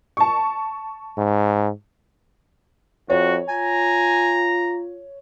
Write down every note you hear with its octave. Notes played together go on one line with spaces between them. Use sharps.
A5 C#6
G#2
F2 F#4 C#5
F4 G#5 A#5